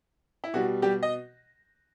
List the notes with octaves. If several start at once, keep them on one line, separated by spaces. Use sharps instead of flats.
E4
B2 G3 F#4
G3 G4
D#5